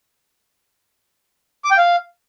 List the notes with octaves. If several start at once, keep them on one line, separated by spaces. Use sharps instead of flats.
D6
G5
F5